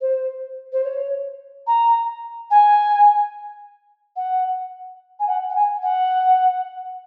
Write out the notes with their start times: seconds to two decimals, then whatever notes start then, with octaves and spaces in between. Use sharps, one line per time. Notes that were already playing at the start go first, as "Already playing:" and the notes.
0.01 C5
0.73 C5
0.84 C#5
1.67 A#5
2.51 G#5
4.16 F#5
5.20 G#5
5.27 F#5
5.50 F#5
5.55 G#5
5.83 F#5